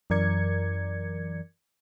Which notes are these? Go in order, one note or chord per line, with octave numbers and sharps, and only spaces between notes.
F#2 E3 A#4 D5 G#6 C#7